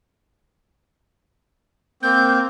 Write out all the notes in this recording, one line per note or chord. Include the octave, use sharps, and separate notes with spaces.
A#3 C4 G6